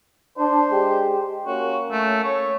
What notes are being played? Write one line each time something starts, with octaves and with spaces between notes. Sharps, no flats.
D4 C5
G#3 G4
A#3 C#4 F#4
A3
C#5